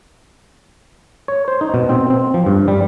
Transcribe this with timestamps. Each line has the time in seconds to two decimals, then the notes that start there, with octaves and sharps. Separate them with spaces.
1.28 C#5
1.48 C5
1.61 D#4
1.74 B2
1.89 C4
2.10 C4
2.34 F3
2.46 G2
2.68 G3